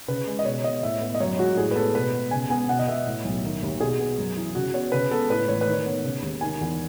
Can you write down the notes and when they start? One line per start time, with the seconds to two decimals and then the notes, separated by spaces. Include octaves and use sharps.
0.08 C#3 B4
0.27 G#3
0.39 D#5
0.45 B2 C#5
0.64 B3 D#5
0.83 A2 E5
1.01 B3
1.15 D#5
1.20 F#2 C#5
1.38 G#3 F#4
1.57 A2 G#4
1.71 B4
1.76 B3 A4
1.95 B2 B4
2.14 B3
2.31 C#3 G#5
2.50 B3 G#5
2.69 B2 F#5
2.79 D#5
2.87 B3 E5
3.06 A2
3.25 B1
3.44 D#3
3.62 D#2
3.80 B2 G#4
4.00 B3
4.18 F#2
4.36 E3
4.55 C#3 F#4
4.74 B3 C#5
4.92 C#3 B4
5.11 B3 A4
5.30 A2 B4
5.48 A1 C#5
5.61 B4
5.66 D#3
5.73 C#5
5.86 B3
6.04 C#3
6.22 D#2
6.41 D#3 G#5
6.61 E2